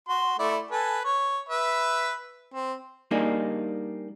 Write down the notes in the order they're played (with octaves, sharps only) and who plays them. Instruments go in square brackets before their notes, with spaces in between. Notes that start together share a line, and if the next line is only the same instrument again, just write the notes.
[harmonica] F#4 C6
A3 E4 D5
A4 B4 G#5
C#5
B4 E5
C4
[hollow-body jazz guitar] G3 A#3 D4 D#4 G#4